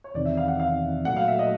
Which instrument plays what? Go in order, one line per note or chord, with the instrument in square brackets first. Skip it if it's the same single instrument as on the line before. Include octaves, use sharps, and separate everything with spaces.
[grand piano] C#5
[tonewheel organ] E2 C3 D#3 [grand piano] D5
[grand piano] E5
F5
F#5
F5
[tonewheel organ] A#2 F#3 A3 [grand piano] F#5
[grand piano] F5
E5
D#5